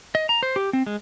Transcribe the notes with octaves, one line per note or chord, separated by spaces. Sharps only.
D#5
A#5
C5
G4
C4
G#3